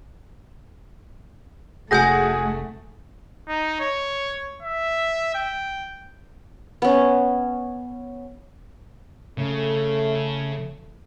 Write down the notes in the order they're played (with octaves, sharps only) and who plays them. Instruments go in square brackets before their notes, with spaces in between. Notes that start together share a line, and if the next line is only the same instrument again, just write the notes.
[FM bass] F1 [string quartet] A3 [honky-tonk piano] F#4 G#4 F#5 [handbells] G#5 G6 A#6
[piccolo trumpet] D#4
C#5
E5
G5
[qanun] B3 C#4
[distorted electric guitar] C#3 [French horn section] A3